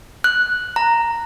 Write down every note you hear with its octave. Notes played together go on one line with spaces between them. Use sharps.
F#6
A#5